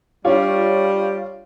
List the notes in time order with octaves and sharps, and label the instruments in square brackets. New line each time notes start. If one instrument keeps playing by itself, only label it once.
[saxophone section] G3 [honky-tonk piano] D4 F4 C#5